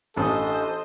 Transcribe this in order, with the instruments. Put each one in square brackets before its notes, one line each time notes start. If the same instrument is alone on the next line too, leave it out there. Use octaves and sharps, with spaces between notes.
[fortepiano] A1 [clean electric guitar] D4 F4 G#4 [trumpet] A4 [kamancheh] C5 D#5